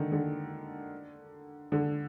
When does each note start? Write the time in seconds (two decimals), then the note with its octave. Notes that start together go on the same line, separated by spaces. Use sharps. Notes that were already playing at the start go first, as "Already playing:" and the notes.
Already playing: D3 D#3
0.12 D3
1.72 D3